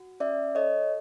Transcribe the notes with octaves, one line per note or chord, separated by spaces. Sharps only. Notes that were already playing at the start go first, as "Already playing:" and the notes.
Already playing: F#4
C#4 D5 E5
A4 C#5 D#5